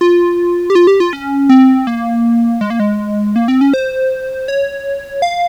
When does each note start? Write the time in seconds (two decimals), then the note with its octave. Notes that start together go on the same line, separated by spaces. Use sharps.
0.01 F4
0.70 G4
0.75 F4
0.87 G4
1.00 F4
1.13 C#4
1.49 C4
1.87 A#3
2.61 G#3
2.70 A#3
2.80 G#3
3.36 A#3
3.48 C4
3.61 C#4
3.74 C5
4.48 C#5
5.22 F5